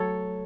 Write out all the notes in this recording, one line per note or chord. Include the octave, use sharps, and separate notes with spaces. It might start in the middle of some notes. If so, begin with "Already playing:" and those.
Already playing: F#3 A3 A4 C#5